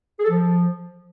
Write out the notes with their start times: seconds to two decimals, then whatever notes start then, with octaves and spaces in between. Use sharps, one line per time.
0.19 G#4
0.25 A4
0.30 F3